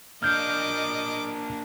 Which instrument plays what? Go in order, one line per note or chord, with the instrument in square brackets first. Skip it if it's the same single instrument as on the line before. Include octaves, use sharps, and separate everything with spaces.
[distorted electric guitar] A#3 D4 [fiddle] D#5 D6 [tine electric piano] F6 G6